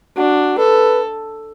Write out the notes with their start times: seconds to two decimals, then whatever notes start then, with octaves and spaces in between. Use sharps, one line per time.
0.17 D4 F#4
0.57 A4 B4